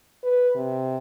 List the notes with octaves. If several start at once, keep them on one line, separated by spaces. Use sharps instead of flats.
B4
C3